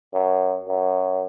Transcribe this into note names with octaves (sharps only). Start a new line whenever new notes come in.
F#2
F#2